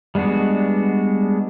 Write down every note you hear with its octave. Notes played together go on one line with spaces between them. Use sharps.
G3 G#3 B3 D4 F#4